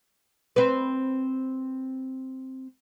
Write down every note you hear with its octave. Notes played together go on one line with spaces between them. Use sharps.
C4 B4